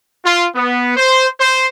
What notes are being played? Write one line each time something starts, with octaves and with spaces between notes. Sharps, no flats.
F4
B3
C5
C5